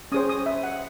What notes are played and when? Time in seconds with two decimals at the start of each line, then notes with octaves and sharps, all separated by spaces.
0.12 C#4 G#4 C5 D#6
0.29 D#6
0.46 E5
0.63 F#5